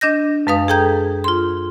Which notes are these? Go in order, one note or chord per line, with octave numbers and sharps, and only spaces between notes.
D4 D#5 G6 A#6
F#2 G#3 B4 F5 D#6
G#4 A4 G5 A#5 G6 G#6
F4 C6